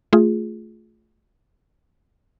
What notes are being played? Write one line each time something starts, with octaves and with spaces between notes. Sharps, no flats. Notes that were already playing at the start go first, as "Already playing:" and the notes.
A3 F4 G#4